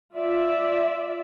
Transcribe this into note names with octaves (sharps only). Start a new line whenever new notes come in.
F4 D5 E5